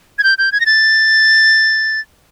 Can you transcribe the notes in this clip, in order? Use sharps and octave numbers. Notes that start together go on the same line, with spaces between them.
G#6
G6
G6
G#6
A#6
A6